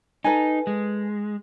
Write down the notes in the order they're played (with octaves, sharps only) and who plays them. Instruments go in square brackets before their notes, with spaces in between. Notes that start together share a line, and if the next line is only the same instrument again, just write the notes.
[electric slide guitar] D#4 [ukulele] A4 B4 G#5
[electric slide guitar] G#3